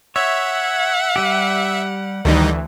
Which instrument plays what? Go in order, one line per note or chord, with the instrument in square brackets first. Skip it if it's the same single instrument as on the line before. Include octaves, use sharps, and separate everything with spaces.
[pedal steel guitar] C#5 [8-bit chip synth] E5 [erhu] F#5
[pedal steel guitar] G3 G4
[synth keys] D2 E3 [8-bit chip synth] D#3 G3 D#4